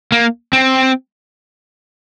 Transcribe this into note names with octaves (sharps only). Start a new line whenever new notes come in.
A#3
C4